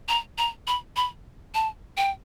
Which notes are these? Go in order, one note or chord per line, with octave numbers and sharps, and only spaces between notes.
A#5
A#5
B5
B5
A5
G5